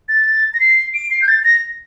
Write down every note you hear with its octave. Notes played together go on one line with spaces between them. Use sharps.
A6
A#6
C7
D7
C7
G6
A6
A#6